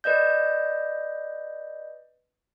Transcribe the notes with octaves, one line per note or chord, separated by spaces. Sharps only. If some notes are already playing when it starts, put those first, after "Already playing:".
B4 D5 D#5 G6